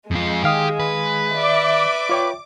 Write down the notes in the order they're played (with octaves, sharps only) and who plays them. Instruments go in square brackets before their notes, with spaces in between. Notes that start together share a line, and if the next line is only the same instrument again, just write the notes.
[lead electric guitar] F2 F4 [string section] G#3
[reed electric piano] D#3 F5 D#6 [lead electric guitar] G4
[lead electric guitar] B4
[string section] D5 E5 [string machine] D6
[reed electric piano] F4 C#5 G5